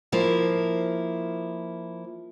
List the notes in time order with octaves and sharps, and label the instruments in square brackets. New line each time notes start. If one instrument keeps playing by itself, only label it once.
[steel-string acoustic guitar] F3 A#3 E4